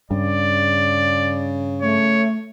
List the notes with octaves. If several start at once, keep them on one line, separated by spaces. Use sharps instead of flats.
G2 C#3 D5
A3 C#5